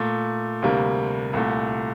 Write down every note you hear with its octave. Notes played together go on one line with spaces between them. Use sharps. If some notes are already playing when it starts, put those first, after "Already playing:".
Already playing: A#2 A3
D2 C3 G3 A#3
C2 A#2 A3